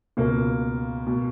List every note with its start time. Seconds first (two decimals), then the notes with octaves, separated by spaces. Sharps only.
0.17 C#2 B2 A#3
1.07 B2